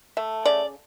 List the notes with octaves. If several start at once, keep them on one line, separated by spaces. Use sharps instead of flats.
A3 E5
C#3 D5